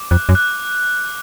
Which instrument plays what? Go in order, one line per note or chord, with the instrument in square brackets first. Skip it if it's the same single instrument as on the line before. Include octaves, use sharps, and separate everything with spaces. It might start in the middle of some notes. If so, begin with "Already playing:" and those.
Already playing: [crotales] D6
[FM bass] F2 [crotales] F#6
[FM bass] F#2
[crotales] F#6